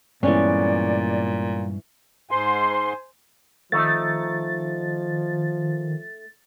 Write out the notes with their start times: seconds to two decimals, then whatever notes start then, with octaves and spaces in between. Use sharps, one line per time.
0.23 G2 A#2 E3 G#3 B3 C#4 D5
2.31 G#2 C5 G#5 C6
3.72 D#3 F3 A3 D#4 A6